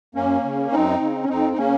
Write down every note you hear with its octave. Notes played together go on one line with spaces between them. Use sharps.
F#2 A#3 C#4
C#3
F#2 C4 D#4
C#3
C#4
F2 C4 D#4
D#4
C#3 A#3 C#4